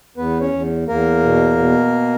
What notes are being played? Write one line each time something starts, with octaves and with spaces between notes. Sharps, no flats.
E2 B3 B4
C#4 C#5
E2
E2 A#3 A#4
B2
B2